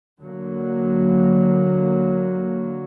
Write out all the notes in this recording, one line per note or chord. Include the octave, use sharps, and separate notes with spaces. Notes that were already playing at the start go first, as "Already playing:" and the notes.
D3 F#3 A#3